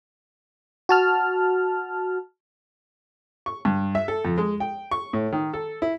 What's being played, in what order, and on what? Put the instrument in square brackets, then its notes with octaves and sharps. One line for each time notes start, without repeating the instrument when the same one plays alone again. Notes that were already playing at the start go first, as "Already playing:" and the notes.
[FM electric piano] F#4 A5 F6
[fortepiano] C#6
G2
E5
A4
F2
G#3
G5
C#6
A2
D#3
A4
E4